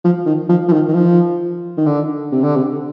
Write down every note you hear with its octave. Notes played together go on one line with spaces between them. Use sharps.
F3
D#3
F3
F3
D#3
D#3
F3
D#3
D3
C3
D3
C3